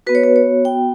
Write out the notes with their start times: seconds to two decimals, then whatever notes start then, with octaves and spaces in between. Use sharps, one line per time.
0.07 B3 F#4 B4
0.15 C#5
0.24 B4
0.36 C#5
0.65 G5